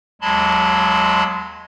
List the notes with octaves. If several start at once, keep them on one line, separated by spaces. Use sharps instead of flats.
D#2 F#3 G#3 A5 B5 C6